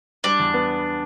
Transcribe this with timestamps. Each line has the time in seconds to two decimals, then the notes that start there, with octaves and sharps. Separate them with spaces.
0.24 G3 D4
0.40 E2
0.54 B3